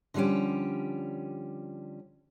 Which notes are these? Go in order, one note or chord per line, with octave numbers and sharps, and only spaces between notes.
D3 F3 G3 C#4 G4